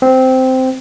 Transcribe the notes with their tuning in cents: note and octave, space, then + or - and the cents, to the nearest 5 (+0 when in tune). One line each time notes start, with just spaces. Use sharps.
C4 -10